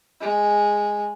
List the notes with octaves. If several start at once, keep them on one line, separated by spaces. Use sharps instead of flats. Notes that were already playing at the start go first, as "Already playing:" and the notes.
G#3